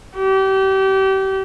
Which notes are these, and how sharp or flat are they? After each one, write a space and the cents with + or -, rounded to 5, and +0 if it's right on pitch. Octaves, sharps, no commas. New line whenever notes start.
G4 -30